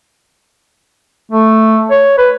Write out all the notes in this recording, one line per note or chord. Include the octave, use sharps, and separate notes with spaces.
A3
C#5
B4